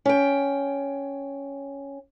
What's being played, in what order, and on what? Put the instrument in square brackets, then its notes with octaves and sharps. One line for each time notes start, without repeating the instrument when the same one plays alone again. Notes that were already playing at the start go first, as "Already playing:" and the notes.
[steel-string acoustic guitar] C#4 G5